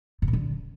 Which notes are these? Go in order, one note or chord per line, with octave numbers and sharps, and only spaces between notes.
G#2
A#2
D3